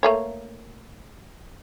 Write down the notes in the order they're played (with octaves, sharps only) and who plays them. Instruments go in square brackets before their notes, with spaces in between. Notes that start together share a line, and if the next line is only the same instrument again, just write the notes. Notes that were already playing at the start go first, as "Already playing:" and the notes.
[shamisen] A3 A#3 C#5